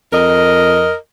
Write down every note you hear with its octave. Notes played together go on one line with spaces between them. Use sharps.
F2 A#4 D#5